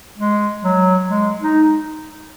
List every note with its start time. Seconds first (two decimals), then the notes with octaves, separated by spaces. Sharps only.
0.18 G#3
0.64 F#3
1.10 G#3
1.41 D#4